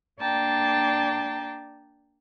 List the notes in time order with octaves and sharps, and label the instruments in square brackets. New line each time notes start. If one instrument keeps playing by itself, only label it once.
[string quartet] A#3 D4 D5 G5 A5 A#5